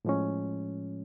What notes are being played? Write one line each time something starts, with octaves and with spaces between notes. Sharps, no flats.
A2 F3 G#3 C#4